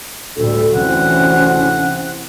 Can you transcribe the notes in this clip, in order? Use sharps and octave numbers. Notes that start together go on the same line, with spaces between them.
D2 A2 G3 A4
C3 E3 C4 C#4 F#5